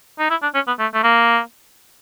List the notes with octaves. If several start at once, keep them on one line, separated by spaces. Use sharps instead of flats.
D#4
E4
D4
C#4
B3
A3
A3
A#3